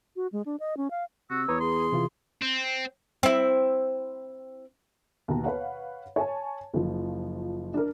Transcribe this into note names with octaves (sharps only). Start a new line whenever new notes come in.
F#4
G#3
D4
D#5
C#4
F5
C3 F#4 E6
E2 B4 C#5 A#5 D#6
G#4 C6
C3 E3 F4
C4
C4 E4
D#2 B2 A#5
B4 C#5 F5 F#5
C#5 G#5 A5
F#1 F3
D4 A#4